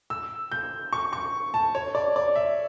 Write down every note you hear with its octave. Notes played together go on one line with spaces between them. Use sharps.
E6
G6
C#6
C#6
A5
C#5
D5
D5
E5